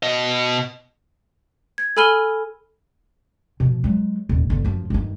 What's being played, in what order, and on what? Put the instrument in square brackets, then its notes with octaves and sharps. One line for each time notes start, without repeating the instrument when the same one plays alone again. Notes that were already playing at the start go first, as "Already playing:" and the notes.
[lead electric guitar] B2 D#5
[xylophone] G#6
A4 G#5 B5 F6 D#7 G7
[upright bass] B2 F3
F#3 G#3
D#1
G1 D3
F#2 F3
G2 D#3